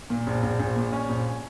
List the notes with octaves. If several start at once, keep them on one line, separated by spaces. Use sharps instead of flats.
A#2
A#1
A#1
A#1
A#2
C#4
A#1